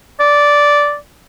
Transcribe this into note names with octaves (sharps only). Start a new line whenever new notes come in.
D5